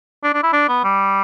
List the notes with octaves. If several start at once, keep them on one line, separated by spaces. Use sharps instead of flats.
D4
D4
E4
D4
B3
G3